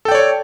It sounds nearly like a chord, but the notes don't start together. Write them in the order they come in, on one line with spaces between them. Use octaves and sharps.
A4 G5 D5 C#5